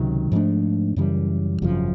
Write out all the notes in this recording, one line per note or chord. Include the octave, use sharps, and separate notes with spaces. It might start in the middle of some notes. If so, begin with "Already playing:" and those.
Already playing: C#2 C3 D#3 F#3
G#2 F3 A3 D4
F#2 C#3 E3 G3
G#1 F#2 C#3 F3